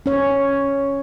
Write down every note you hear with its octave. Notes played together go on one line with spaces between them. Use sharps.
C#4 C#5